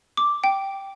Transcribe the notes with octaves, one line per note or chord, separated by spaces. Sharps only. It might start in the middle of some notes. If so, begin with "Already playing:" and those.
D6
G5